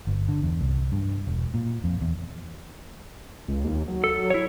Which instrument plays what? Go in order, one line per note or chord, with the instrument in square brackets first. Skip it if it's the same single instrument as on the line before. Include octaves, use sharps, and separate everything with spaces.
[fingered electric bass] G1
D3
E2
C2
G2
E1
A#2
F2
E2
[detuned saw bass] C#2
D#2
F#3
[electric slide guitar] A4
E4 C#5